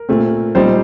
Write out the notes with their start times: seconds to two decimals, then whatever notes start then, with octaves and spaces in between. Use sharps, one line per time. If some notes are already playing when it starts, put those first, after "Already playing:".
Already playing: A#4
0.09 A#2 A3 C4
0.55 A#2 G3 C4 D#4 C5